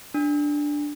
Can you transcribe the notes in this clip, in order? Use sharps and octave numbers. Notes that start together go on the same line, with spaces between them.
D4